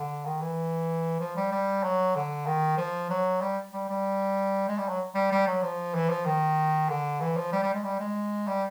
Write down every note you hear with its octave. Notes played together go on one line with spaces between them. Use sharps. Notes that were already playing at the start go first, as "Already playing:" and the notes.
Already playing: D3
D#3
E3
F3
G3
G3
F#3
D3
D#3
F3
F#3
G3
G3
G3
G#3
G3
F#3
G3
G3
F#3
F3
E3
F3
D#3
D3
E3
F3
G3
G3
G#3
G3
G#3
G3